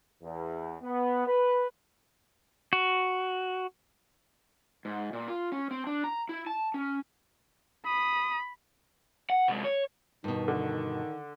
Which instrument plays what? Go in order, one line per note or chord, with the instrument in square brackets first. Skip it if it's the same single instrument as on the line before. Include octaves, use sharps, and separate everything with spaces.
[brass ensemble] E2
B3
B4
[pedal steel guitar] F#4
[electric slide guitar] G#2
A#2
F4
C#4
C4
D4
A#5
E4
A5
C#4
[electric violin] B5 [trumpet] D#6
[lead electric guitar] F#5
C3 G#3
C#5
[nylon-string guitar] G2 B2 [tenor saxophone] D#3
[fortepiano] D3